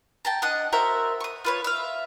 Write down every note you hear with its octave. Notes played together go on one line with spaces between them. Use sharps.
G5 A5 A#5
D4 D#5 F#5
F#4 A#4 C5 E5
C#6 D#6
F4 B4 C#5
E5 F5